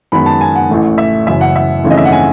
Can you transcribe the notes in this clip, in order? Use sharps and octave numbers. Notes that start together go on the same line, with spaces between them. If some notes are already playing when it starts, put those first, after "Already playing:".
F#2 D#3 G#3 B3 B5
A5
G#5
F#5
A1 A2 E3 A3
E5
F#1 F#2 E3 E5
F#5
E5
G#1 F#2 C#3 E3 A3
D#5
E5
F#5
G#5